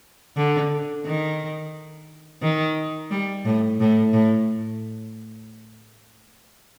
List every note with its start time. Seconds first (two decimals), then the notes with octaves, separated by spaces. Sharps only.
0.37 D3
1.06 D#3
2.42 D#3
3.11 G3
3.45 A2
3.80 A2
4.13 A2